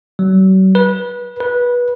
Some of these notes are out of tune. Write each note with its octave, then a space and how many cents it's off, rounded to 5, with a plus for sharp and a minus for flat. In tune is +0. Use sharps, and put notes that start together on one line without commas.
F#3 +40
B4 -25
B4 -20